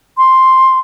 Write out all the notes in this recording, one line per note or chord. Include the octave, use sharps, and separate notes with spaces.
C6